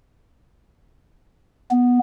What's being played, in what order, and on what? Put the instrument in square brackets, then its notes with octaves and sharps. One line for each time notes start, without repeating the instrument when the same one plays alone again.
[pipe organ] B3